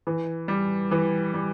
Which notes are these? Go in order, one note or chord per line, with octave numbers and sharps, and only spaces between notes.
E3
G3
E3
G3